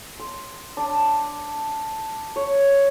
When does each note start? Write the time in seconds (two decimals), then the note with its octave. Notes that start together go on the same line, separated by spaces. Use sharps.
0.19 C6
0.77 D4
2.36 C#5